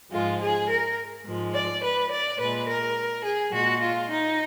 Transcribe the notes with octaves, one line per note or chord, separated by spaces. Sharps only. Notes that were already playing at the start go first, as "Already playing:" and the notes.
G#2 F3 G#3 F4
G#4
A#4
G#2 F3 G#3
D5
B4
D5
A#2 G#3 B4
A#4
G#4
A#2 G#3 F#4
F4
D#4